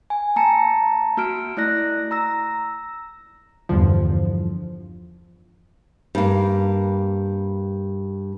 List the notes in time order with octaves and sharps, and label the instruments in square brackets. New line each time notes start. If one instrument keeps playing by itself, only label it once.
[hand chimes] G#5
A#3 A5 A#5 C#7
A#3 F#4 F6 D7
A3 E4 D5 F#6 A#6
A#5 E6 A#6
[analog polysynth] E2 G2 D3 F3
[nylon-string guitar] G2 A#3